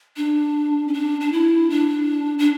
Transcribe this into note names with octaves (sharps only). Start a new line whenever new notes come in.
D4
C#4
D4
D4
E4
D4
D4